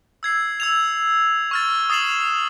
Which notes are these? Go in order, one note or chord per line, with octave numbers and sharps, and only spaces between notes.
E6 G#6 C7
E6 G#6 F7
C#6 F6 A6
D#6 A6 C7 E7 F#7